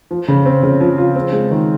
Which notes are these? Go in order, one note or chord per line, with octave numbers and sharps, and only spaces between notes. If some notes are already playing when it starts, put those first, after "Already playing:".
F3
C#3
C4
C#3
F3
F4
C4
G#3
D#3